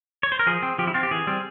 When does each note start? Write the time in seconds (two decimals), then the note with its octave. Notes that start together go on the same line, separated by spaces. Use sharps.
0.23 C#5
0.32 C5
0.39 A#4
0.47 F3 G#4
0.63 C4
0.78 F3 G4
0.87 E4
0.94 C4 F4
1.03 G4
1.11 E3 G#4
1.27 G3 C4